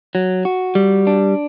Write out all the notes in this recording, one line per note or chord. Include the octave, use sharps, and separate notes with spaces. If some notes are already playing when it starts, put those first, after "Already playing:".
F#3
F#4
G3
D4